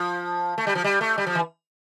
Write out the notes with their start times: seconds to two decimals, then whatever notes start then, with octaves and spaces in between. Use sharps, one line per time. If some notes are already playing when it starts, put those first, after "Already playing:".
Already playing: F3
0.58 A3
0.67 G3
0.75 F3
0.84 G3
1.01 A3
1.18 G3
1.27 F3
1.35 E3